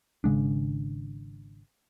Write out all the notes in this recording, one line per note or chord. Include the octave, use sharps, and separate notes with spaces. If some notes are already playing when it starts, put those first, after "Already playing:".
G#1 C#3 G#3 D4